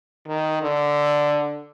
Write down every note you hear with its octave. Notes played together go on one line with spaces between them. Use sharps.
D#3
D3